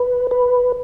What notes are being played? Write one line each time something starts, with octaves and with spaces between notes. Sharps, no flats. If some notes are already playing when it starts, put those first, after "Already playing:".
Already playing: B4
B4